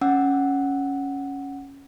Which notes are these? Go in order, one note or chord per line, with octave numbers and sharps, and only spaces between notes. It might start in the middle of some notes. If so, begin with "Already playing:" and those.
C#4 F#5 E6